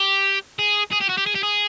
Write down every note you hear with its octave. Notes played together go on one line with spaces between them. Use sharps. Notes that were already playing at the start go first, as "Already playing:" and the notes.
Already playing: G4
G#4
G#4
G4
F#4
G4
G#4
G4
G#4